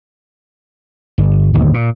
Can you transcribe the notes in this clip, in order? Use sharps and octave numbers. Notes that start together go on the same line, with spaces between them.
G1
D1 G1 D#2
A#2